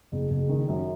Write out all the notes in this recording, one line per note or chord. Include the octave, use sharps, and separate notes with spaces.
F#1
F#1
D#3
F#2